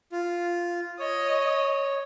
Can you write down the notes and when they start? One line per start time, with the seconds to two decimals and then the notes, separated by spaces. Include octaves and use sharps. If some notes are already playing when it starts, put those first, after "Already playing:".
0.12 F4
0.99 C#5 D#5